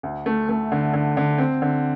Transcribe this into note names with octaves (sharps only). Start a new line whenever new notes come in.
D2
A3
A3
D3
D3
D3
C4
D3